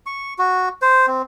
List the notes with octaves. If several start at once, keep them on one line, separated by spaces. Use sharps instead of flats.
C#6
F#4
C5
C4